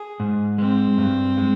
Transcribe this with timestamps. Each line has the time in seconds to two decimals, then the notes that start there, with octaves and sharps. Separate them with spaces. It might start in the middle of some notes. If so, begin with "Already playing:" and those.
Already playing: G#4
0.20 G#2
0.58 G#3 C4
0.98 G2
1.37 G#3